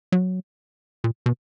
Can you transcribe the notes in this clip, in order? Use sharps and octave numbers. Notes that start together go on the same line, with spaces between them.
F#3
A#2
B2